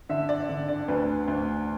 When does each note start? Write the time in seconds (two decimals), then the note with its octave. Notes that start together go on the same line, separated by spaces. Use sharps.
0.09 D3 E5
0.29 D5
0.49 D3
0.68 D5
0.88 D2 B4
1.28 D2